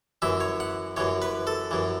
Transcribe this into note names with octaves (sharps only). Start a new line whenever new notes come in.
F#2 E3 E5
C#5
F#5
F#2 E3 C#5
B4
A4
F#2 E3